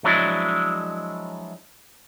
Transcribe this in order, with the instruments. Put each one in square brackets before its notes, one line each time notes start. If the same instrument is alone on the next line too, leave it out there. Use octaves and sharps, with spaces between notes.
[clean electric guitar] F3 F#3 G#3 D4 E4